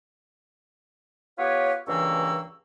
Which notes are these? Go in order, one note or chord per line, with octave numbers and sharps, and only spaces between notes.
B3 F4 G4 B4 C#5
C#2 G2 E3 A#3 C#6 E6